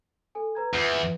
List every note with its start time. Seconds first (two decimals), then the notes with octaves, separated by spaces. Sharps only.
0.35 A4 G#5
0.55 B4 A#5 G#6
0.73 E2 F4 B4 E5